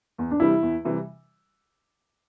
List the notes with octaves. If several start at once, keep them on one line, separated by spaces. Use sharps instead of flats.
E2
D4
C3 E3 G3 E4
E2
C3 E3 G3